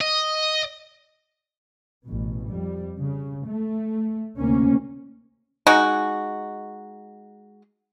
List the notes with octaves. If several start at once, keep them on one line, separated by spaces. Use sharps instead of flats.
D#5
A1 B2
F2 G3
C#3
A3
D2 C3 A#3 C#4
G#3 D#4 F#4